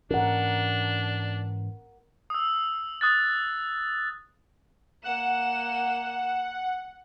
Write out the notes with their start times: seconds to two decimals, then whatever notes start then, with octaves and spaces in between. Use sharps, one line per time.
0.11 G#2 E3 C#4 D4 A#4 F#5
2.30 D#6 E6
3.01 D#6 F#6 A6
5.04 A#3 F#5 E7